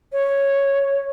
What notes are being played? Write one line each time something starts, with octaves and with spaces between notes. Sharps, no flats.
C#5